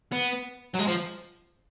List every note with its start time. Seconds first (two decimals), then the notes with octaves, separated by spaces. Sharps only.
0.12 B3
0.74 F#3
0.79 G#3
0.87 F3